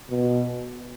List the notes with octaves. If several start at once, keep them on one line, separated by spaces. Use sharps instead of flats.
B2